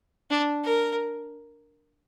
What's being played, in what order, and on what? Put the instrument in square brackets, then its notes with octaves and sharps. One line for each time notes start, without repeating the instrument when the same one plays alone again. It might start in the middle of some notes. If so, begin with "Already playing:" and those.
[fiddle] D4
A#4